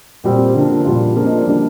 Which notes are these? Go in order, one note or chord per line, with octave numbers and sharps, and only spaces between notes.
A#2 G3 C4 G4
D3 F3 A#3 D4
A#2 G3 D4 F4
F3 A#3 D4 G#4
D#5
D5
D3 G3 A#3 D4